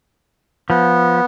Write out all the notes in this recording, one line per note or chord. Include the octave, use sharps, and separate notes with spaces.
F3 B3